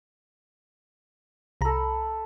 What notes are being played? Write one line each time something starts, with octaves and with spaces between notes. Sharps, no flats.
C2 A4 A#5 B5